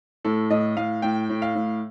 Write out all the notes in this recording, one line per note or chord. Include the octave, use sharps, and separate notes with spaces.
A2 A4
A2 D#5
A2 F5
A2 G5
A2
F5
A2